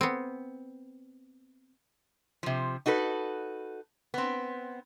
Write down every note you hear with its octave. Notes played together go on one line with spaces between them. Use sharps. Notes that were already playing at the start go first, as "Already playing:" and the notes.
B3 C4
C3 F3
D#4 F#4 A4 B4
B3 C4